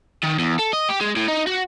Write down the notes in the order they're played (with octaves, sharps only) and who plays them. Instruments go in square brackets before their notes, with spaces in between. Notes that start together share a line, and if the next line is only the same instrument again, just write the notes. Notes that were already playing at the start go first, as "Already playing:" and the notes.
[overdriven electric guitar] D#3
E2
A4
D#5
G4
G#3
A2
D#4
F#4